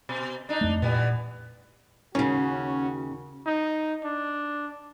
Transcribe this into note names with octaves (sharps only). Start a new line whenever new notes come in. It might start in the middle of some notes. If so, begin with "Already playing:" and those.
B2
D4 D#4
F2 A3
A#2 E3 G3 B3
D#2 C#3 C#4 F#4
D#4
D4